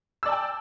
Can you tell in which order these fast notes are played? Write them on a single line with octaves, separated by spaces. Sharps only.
E6 D5 A5 G5